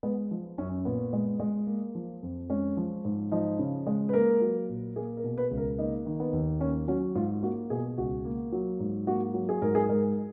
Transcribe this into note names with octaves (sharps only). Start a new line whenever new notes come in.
G#3 B3
F3
F#2 C#4
A#2 B3
G#3
G#3
A#3
F3
F2
G#3 C#4
F3
G#2
F3 D#4
C#3
G#3
B4
A#3 A#4
F#3
A#2
A#3 G#4
A#4
B2
B4
C#2
A#4
A#3 D#4
D#3
B3
D#2
A#3 C#4
F#3 C#4
G#2 F4
A#3 F#4
B2 G#4
C#2 F#4
A#3
F#3
G#2
A#3 F#4
F#3
G#4
G#2 A#4
G#4
G#3 A#4